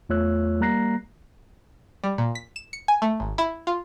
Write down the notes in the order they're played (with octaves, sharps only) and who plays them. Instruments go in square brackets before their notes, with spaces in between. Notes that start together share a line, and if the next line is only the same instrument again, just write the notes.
[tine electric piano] E2 A3 F4 C#5 E6 F#6
G3 A#3 A#5 F#6 A#6 C7
[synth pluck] G3
A#2
B6
E7
C#7
G#5
A3
G#1
E4
F4